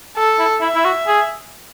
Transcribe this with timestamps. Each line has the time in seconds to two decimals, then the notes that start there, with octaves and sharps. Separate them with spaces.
0.17 A4
0.39 E4
0.61 E4 E5
0.75 E4
0.85 F#4
1.07 G#4